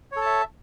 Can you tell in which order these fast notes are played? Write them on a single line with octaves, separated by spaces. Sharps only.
C#5 A4 A5 E5